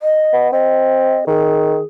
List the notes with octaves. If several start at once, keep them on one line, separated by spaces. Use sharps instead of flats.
D#5
B3
C4 D#5
D#3 G#4